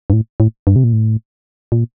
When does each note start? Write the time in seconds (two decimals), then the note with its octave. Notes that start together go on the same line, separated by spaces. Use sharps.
0.10 G2
0.13 A2
0.40 A2
0.67 G2
0.76 C3
0.84 A#2
0.93 A2
1.72 A#2